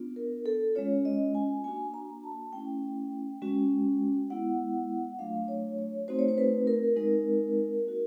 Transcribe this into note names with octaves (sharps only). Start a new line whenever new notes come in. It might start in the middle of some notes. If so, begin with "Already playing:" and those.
Already playing: B3 D4 F4
A#4
A4
G#3 C#4 F4 C#5
D#5
G#5
A#3 D4 F#4 G#5
A#5
A5
A3 C#4 E4 G5
G#3 C#4 F#4
G#3 B3 E4 F#5
F#3 A3 D4 F4 F5
C#5
C#5
A3 C4 D#4 F#4 C5
C#5
C5
B4
A#4
G#3 C4 D#4 A#4
A#3 D#4 F#4